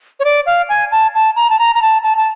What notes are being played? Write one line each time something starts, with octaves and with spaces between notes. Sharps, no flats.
C#5
D5
F5
G#5
A5
A5
A#5
A5
A#5
A#5
A5
A5
A5